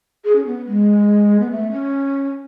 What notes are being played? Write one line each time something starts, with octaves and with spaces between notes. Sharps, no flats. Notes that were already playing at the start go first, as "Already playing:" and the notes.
G#4
C#4
B3
G#3
B3
A3
C#4